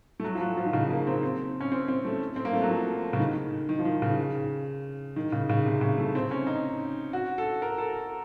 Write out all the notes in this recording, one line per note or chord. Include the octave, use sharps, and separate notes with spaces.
A3
F#3
F3
F#3
F3
D#3
C#3
A#3
C4
C4
C#4
C4
C4
A3
C4
A#3
A3
F#3
F3
C#3
D#3
D#3
F3
D#3
C#3
D#3
C#3
C#3
C3
C#3
A3
C4
C#4
D#4
F#4
A4
A#4
A4